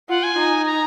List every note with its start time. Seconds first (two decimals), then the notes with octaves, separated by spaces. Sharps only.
0.09 F4 F#5
0.23 G#5
0.38 D#4
0.66 A#5